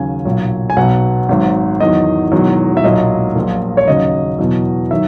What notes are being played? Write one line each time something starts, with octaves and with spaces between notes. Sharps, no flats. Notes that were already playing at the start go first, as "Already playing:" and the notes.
Already playing: D#2 C#3 F#3 G#5
B1 A#2 F#3
G#5
B1 B2 F#3 F#5
G#1 G#2 F#3
E2 D#3 F#3 D#5
E1 E2 D#3 F#3
E5
B1 A#2 F#3 D#5
A#1 A#2 F#3
C#5
D#2 C#3 F#3 D#5
E2 B2 F#3
D#3 F#3 E5